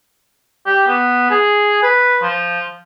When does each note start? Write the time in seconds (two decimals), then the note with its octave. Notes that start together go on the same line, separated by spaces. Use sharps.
0.66 G4
0.87 B3
1.30 G#4
1.83 B4
2.22 F3